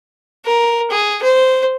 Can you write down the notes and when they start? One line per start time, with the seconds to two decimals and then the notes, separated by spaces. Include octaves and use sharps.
0.45 A#4
0.91 G#4
1.22 C5